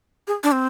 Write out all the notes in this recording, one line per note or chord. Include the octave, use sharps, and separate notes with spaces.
G#4
D4
C4